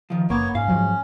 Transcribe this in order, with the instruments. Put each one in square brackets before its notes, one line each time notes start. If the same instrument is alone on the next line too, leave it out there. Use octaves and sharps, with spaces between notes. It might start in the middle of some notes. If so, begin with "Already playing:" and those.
[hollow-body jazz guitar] D#3 F3
[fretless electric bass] F#1 [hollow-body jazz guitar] A#3 [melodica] B3 C#5
[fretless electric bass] G#2 [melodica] C#4 [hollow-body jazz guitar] F5
[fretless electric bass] G#2 F3 F#3